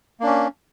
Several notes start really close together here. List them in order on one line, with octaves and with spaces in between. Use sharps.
A#3 D4 C#4